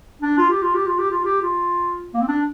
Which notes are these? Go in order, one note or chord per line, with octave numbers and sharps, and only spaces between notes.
D4
F4
G4
F4
G4
F4
G4
F4
G4
F4
A#3
C4
D4